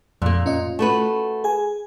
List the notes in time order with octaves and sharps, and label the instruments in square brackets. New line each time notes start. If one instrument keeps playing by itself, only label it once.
[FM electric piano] F2 [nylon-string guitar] A#2 A#3
[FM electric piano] C#4 F4 D#5
[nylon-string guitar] A3 F#4 B4
[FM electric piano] G#4 G#5